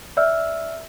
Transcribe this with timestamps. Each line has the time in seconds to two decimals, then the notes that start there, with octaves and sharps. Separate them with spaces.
0.17 D5 E5 E6 F6